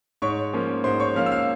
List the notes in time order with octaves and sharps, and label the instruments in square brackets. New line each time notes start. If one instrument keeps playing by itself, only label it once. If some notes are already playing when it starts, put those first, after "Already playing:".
[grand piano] G#2 C#5 C#6
F3 A#3 C#4
G#2 C5 C6
C#5 C#6
F3 A#3 C#4 F5 F6
E6
F5 F6